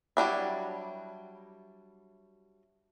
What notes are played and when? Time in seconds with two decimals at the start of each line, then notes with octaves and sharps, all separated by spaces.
0.17 F#3 G3 D4 E4